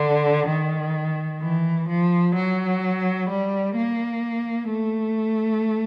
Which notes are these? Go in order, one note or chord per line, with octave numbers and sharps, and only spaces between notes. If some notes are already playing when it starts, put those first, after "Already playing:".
Already playing: D3
D#3
E3
F3
F#3
G3
A#3
A3